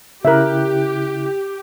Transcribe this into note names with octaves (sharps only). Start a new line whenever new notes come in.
C#3 E4 G4 A#4 E5 F#6